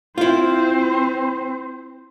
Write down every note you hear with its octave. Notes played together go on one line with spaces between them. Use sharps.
C4 E4 F4 C5